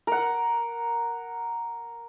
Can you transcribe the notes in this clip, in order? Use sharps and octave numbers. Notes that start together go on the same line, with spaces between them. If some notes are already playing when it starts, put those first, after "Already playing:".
A#4 F#5